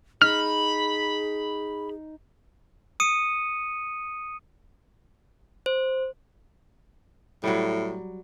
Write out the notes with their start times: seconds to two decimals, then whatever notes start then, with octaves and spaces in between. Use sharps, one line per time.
0.22 D#4 G#4 B5 F6
3.00 D#6 C#7 D#7
5.66 C5
7.44 A2 F#3 G3